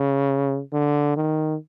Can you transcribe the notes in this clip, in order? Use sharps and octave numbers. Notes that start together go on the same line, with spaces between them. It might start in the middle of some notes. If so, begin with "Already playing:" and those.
Already playing: C#3
D3
D#3